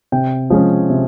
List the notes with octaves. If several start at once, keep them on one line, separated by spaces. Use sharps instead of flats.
C3 G5
F3 G#3 C#4
C3